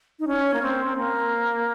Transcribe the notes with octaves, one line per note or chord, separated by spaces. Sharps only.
D#4
C#4
A#3
C4
C4
A#3